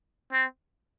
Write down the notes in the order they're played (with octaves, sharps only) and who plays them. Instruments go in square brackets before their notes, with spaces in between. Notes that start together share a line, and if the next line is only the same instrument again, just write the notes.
[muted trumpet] C4